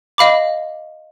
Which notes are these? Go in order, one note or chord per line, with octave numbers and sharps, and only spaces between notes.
D#5 F5 B5 D6